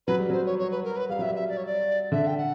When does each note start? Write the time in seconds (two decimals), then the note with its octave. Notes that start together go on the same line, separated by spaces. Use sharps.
0.07 F#3 B4
0.19 G3
0.30 F#3 C5
0.46 C#5
0.59 C#5
0.71 B4
0.84 A#4
0.96 B4
1.09 G3 F5
1.19 F#3 E5
1.29 G3
1.35 E5
1.49 D5
1.57 C#5
1.66 D5
2.12 D3 E5
2.27 G5
2.38 F#5